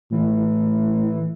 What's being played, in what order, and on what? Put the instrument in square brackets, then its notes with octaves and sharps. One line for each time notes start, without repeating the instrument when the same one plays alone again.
[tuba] A2 [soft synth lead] E3